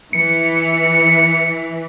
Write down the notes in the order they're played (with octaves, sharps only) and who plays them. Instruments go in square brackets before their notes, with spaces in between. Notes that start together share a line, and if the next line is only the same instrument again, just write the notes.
[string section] E3 [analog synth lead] C#7